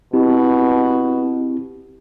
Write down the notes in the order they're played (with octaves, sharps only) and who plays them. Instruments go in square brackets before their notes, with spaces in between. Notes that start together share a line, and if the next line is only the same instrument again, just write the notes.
[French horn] B2 [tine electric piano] C4 E4 G4